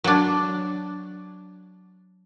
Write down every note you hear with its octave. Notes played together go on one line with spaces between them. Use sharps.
F#3 D4